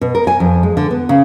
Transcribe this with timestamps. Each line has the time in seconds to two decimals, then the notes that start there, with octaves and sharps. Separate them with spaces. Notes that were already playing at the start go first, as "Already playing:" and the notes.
0.01 B2
0.15 A#4
0.27 G#5
0.40 F2
0.63 G#3
0.77 D3
0.91 B3
1.09 C#3